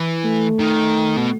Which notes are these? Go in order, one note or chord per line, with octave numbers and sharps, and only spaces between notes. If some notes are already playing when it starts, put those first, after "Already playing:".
Already playing: E3
A3
D#3
B2